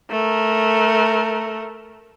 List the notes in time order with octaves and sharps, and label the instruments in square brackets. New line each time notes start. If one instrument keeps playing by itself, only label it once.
[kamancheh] A3 A#4